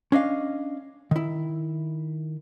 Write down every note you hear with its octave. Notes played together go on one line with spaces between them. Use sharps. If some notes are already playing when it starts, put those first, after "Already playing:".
C#4 D4 D#5 F5
D#3 E4